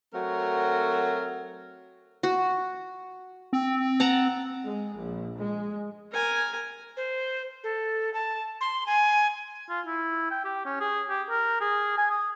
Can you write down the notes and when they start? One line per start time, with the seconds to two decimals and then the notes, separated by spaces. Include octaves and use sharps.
0.12 F#3 A3 C4 F#4 A#4
2.23 F#4
3.53 C4
4.00 F#5 A5 A#5
4.67 G#3
4.96 A#1
5.40 G#3
6.12 A#4 G#5
6.97 C5
7.64 A4
8.14 A5
8.61 C6
8.86 G#5
9.69 F4
9.86 E4
10.31 G5
10.44 G4
10.65 C#4
10.80 G#4
11.09 G4
11.30 A#4
11.61 G#4
11.98 G#5
12.10 D#6